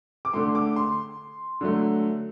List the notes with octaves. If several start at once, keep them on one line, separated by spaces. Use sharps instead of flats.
D6
D3 A3 C6
D6
C6
D3 F#3 A3